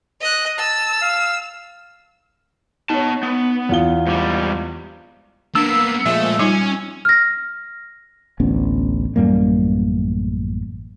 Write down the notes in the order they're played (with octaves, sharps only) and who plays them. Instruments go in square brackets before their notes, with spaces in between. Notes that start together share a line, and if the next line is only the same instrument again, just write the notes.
[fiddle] D#5 F#6
[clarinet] A5 [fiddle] E6
[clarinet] F5
[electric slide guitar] B3 A5 [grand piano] D#4 C#5
[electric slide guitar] B3
[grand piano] E2 F4 G7
[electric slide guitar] G#2 G3
[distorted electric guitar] A#3 B3 [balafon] D4 [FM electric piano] E6 [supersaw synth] C7
[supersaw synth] A#2 F3 G#3 [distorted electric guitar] A3 A4 [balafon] E5
[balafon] G3 D#4 F4 [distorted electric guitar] C#4 [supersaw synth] G#5
[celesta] F6 A#6
[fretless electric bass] A1 D2 B3 C#4
A1 F#2 G3 A#3